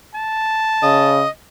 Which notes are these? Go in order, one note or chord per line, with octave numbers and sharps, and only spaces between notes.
A5
C#3 D#5